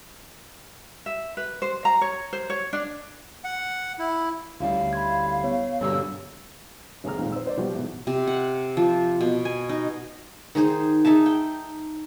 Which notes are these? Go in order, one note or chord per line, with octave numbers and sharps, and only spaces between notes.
E5
B4
C5
A#5
C#5
C5
C#5
D4
F#5
E4
D2 G3 C#4 E4 F5
B5 C6 G#6
B3 C#5
G2 B2 D3 G3 A#3 C#4 E6
G#1 D#2 G#4 A#5 F6
F2 A#2 D#3 G#3
C5 E6
A#4 C5 D5
B2 F3 G3 G4
E2 G#2 B2
C3
F#5
F3
B2
G#5
D#4
D#3 D#4 G#4 C5
D#4 G#4 E5 A5
G5